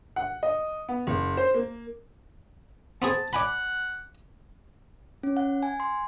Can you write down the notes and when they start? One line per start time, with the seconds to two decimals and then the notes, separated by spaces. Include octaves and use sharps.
0.16 F#5
0.43 D#5
0.89 B3
1.07 F#1
1.37 C5
1.54 A#3
3.02 B3 C4 G#4 A5
3.33 D5 F#5 G#5 B5
5.23 C#4
5.37 F#5
5.63 G#5
5.80 C6